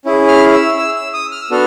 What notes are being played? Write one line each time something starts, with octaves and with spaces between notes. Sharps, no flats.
C#4 E4 G#4
F6
E6
E6
E6
D#6
F6
E6
B3 D4 F#4 A4 F6